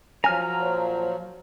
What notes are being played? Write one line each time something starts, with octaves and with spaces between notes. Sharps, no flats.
F3 F#3 G#5 A#5 F6
A#2 C5 C#5